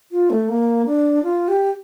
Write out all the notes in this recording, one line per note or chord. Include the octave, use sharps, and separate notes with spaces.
F4
A3
A#3
D4
F4
G4